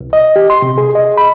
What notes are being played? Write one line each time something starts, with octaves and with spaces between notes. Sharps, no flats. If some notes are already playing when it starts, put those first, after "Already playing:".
C2
D#5
G4
C6
C3
G#4
D#5
B5